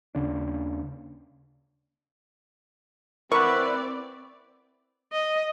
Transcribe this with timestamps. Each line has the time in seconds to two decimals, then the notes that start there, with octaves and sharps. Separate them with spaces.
0.15 D#2 C#3 D4
3.32 C4 E4 A#4 B4 D5 F#5 C#6
5.12 D#5